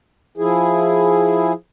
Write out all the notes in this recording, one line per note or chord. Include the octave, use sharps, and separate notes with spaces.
F3 E4 G#4